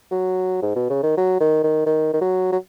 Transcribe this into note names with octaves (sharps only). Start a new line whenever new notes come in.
F#3
G#2
B2
C#3
D#3
F#3
D#3
D#3
D#3
D#3
F#3
F#3